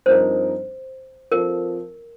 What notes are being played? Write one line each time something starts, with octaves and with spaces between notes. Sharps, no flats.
G2 F3 C4 D#4 A#4 C5
F3 C4 F4 A4 A#4